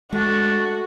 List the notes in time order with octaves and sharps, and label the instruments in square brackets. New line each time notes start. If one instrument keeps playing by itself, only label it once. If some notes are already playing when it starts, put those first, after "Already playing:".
[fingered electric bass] G#3 [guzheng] A3 [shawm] D4 [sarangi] F#4